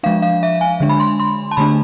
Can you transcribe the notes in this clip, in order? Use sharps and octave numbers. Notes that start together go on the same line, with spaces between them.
F3 G#3 D4 F5
F5
E5
G#5
D3 G#3 D4
B5
C6
C6
A5
D3 A3 D4 B5